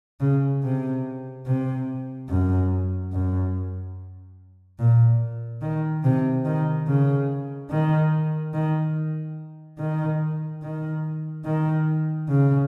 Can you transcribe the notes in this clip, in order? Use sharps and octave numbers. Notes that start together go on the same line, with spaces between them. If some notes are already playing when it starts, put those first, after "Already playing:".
C#3
C3
C3
F#2
F#2
A#2
D#3
C3
D#3
C#3
D#3
D#3
D#3
D#3
D#3
C#3